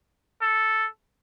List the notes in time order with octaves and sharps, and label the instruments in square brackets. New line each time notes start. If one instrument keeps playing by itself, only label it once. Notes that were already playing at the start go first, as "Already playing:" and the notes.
[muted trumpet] A4